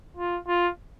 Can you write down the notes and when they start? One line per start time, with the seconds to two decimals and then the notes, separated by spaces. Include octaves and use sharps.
0.17 F4
0.48 F4